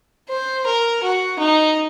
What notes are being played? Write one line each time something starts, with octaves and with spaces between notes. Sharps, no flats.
C5
A#4
F#4
D#4